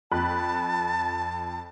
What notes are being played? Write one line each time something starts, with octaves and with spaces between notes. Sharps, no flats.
F2 A5 B5 F#6